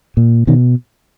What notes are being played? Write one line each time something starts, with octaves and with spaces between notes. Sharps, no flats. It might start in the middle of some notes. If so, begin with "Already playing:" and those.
A#2
B2 D#3